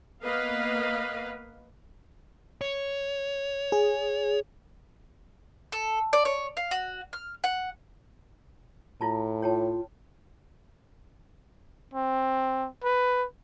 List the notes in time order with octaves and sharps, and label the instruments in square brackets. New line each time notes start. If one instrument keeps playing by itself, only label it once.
[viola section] A#3 B3 B4 D#5 F5
[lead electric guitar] C#5
[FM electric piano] G#4
[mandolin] A4
D5
C#5
F5
F#4
F6
F#5
[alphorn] A2 [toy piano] E4 F4 A5
[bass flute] F4 [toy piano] C#5 G5 A5
[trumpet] C4
B4